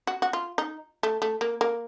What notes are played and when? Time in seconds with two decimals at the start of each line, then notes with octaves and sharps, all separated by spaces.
0.07 F#4
0.22 F#4
0.33 F4
0.58 D#4
1.03 A3
1.22 A3
1.41 A#3
1.61 A#3